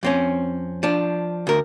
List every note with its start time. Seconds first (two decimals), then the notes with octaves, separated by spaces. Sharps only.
0.03 F2 C4 C#4
0.83 F3 D4
1.47 D2 A#4